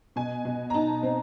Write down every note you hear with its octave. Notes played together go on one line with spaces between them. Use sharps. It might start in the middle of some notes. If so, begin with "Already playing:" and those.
B2 G#5
B2
A#5
D#4 A5
C4